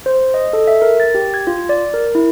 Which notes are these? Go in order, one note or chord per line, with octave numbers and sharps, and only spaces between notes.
C5
D#5
A4
E5
A#4
A6
G4
G#6
F4
D5
A#4
E4